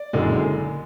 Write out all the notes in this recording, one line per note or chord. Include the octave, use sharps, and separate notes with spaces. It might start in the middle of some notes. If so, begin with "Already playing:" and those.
Already playing: D5
F#1 F#2 D3 G#3